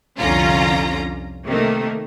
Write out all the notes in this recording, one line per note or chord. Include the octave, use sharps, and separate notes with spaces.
C2 F2 D3 C#4 F4 A#5
C3 D#3 A3 A#3